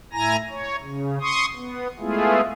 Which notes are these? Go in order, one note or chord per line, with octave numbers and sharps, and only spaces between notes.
A2 E4 G#5 A#5 A#6
C#5
C#3
C6 C#6 D#6
B3
G#3 A3 B3 E4 F4 G#4